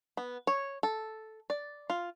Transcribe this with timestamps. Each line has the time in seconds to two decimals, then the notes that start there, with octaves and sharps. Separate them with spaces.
0.17 B3
0.47 C#5
0.83 A4
1.50 D5
1.90 F4